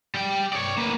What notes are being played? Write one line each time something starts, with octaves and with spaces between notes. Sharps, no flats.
G3 G5
C#5 D5
A#3 B4